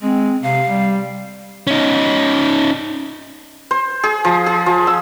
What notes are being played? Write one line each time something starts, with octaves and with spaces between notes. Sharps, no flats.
G#3 C4
C3 F5
G3
C#4 D#4
C5
G#4
F3
G#4
F3
E6